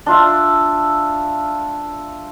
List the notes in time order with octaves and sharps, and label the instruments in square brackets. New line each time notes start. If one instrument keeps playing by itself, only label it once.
[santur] D4 F4 E5